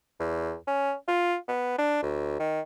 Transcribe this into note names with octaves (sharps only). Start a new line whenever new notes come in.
E2
C#4
F4
B3
D4
D2
D#3